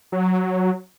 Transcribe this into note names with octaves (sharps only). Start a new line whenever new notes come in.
F#3